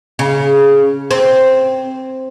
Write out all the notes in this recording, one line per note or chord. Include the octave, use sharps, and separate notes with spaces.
C#3
C4